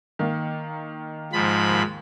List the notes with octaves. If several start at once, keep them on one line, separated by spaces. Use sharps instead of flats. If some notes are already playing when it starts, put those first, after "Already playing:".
D#3 A#3
G#2 F3 B5
D#2